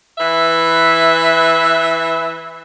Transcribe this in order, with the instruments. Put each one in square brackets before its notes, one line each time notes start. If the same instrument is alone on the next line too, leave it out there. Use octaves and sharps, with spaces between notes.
[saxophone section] E3 B4 E5